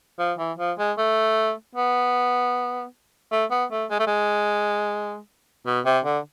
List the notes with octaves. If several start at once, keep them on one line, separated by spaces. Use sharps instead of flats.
F3
E3
F3
G#3
A3
B3
A3
B3
A3
G#3
A3
G#3
B2
C3
D3